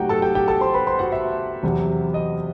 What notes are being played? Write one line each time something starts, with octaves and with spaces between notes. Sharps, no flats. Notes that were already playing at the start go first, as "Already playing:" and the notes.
Already playing: C3 F#3 A3 D#4 F#4 G4 F#5 G5
A4 A5
G4 G5
G4 G5
A4 A5
C5 C6
B4 B5
C5 C6
F#4 F#5
E5
E2 C3 F#3
D#5